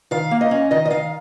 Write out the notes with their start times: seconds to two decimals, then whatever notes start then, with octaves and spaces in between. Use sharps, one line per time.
0.11 D#3 F5
0.31 A#3
0.41 D#5
0.51 C#4
0.71 D#3 D#5
0.85 D#5
0.90 D#3 F5